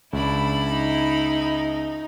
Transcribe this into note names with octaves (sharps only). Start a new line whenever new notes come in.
C#2 D4 E4 B5
D#4